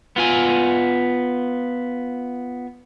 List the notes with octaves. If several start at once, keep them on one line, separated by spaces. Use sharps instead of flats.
B3 F4 G#5